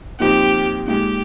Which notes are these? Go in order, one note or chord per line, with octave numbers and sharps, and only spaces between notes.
A#2 F3 C4 D#4 G4
A#2 G#3 D#4 G4